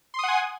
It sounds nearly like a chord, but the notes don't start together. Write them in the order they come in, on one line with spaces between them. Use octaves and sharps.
C6 D#6 F#5 G#5